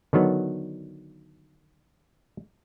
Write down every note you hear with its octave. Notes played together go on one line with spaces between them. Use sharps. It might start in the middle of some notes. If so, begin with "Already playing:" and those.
D3 D#3 F#3 B3